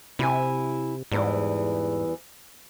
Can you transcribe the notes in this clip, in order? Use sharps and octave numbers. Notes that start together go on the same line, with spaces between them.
C3 E4 G#5
E2 G#2 E3 G3